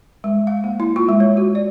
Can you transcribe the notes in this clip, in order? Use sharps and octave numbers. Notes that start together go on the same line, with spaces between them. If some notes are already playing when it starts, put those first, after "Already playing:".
G#3
F5
A#3
E4
F4
G#3
C#5
F#4
D5